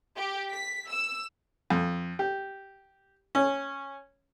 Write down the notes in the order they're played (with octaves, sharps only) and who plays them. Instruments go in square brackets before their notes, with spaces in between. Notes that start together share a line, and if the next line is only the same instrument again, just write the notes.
[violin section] G4
B6
E6
[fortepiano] F2
G4
C#4